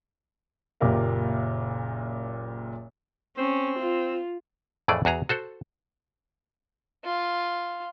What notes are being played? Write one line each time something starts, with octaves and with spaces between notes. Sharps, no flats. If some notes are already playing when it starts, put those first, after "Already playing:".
F#1 A#2 G4 A#4 F5
C4 C#4
F4
F2 A2 E3 A3 G#4 D5
E2 F#4 G#4 A#5
F#4 A4 C5 F#5
F4